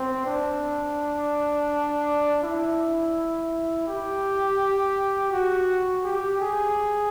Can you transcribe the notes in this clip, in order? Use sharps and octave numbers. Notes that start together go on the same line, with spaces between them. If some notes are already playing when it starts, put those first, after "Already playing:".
Already playing: C4
D4
E4
G4
F#4
G4
G#4